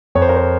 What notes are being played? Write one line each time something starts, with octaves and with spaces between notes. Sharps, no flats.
F2 C#5
C5
A#4
C5